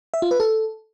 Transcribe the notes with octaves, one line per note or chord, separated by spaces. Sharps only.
E5
F4
B4
A4